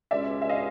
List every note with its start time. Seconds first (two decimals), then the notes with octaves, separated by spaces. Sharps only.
0.11 C#2 B2 G#3 C#4 D5 E5
0.42 E5
0.49 D#5 F5